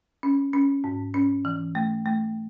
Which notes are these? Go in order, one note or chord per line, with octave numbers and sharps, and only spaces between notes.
C#4
C#4
G#2
C#4
E3
A3
A3